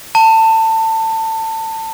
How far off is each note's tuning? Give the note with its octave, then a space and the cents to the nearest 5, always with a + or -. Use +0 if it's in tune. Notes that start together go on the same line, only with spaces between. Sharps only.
A5 +25